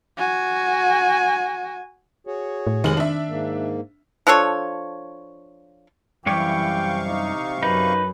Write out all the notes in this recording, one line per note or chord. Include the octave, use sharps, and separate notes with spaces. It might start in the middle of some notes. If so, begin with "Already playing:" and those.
F#4 G#5
F#4 G#4 C#5
A2
F1 D#3 G#3 F#7
D4 E5
G#2 A#3
F3 D4 A4 C#5
F#2 C3 E3 G3 C#5 F5 G5 C#6
D#4
F#2 D#4 B4